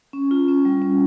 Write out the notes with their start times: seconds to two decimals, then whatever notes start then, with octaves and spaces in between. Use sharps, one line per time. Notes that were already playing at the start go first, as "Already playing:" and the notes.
0.13 C#4
0.31 F4
0.48 C#4
0.65 G3
0.82 C#4